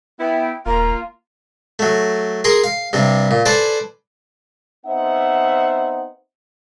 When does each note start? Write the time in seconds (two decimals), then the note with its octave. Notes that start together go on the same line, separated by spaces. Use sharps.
0.20 B3 E4 G5
0.66 D#1 A#3 F4 A#5
1.79 F#3 A3
2.44 G#4 A#4 C6
2.64 F5
2.93 G2 C3 G3
3.31 A#2
3.46 A4 B4 C5 D5 G#5
4.86 B3 C4 D#4 C5 E5 F#5